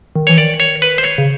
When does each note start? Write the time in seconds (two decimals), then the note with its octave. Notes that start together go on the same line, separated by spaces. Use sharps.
0.16 D#3
0.27 E3 C#5
0.37 D#3 D5
0.60 C#5
0.82 B4
0.98 C5
1.03 C#5
1.18 C#3